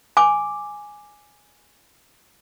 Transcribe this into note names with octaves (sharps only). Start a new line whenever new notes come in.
G#5 D6